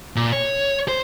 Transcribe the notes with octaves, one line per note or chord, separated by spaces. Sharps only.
A#2
C#5
C5